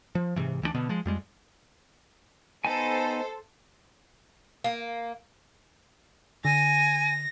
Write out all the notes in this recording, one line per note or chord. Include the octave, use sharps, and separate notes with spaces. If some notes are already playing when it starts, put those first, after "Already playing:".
F3
G#2 C3 D#3 E3
D2 E3 F#3 D4
B2 D3 B3
F3 G#3
F2 G3 G#3
B3 D#4 A4 C5 G#5
A#3
D3 G#5 A#6